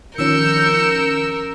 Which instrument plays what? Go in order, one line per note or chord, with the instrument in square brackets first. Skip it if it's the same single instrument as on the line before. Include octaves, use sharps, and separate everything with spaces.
[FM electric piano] D#3 F3 C#4 [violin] A#4 [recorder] E6 [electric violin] G6 C#7